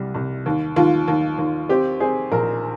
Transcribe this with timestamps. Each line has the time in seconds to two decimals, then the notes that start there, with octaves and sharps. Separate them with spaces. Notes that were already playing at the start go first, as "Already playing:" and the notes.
Already playing: C2 G3
0.15 C2
0.46 D#2
0.76 D#2 F4
1.08 D#2
1.38 D#2
1.69 C4 G4
2.00 C4 G#4
2.32 A#1 A#4